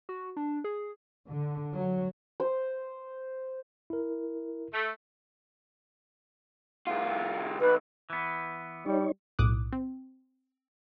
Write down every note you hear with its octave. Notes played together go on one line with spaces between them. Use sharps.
F#4
D4
G#4
D3
F#3
C5
E4 A#4
A3
C2 F4
B1 B4
E3 B3
G3 D#4 C#5
B1 A2 D6 D#6 F#6
C4